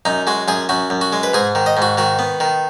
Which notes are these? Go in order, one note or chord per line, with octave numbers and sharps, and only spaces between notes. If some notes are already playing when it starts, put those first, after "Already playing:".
F#2 D#4
G#3 F#4
F#2 G#4
F#2 F#4
F#2
F#4
G#3
B4
G#2 G#4
D#3
D#5
G#2
F#4
D#3 F#4
B3
D#3